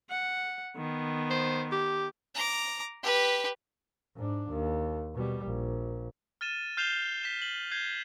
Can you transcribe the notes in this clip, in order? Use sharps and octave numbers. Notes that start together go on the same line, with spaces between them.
F#5
D#3 B3
C5
G4
A#5 D6
G4 B4
G#2 D4
D#2
B2 G3
A#1
F6 A6 D#7 E7
F6 G6 C7 E7 F7 G7
B6 C7 E7
F#7
F6 G6 G#6 C7